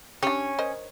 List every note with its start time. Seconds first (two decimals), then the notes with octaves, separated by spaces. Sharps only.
0.23 C#4 D4 G4
0.59 A#4 C5 D#5